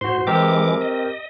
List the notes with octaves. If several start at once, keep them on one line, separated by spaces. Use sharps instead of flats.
A2 F#4 C5 C6
E3 G#3 C4 G4 A#4 D6
D#5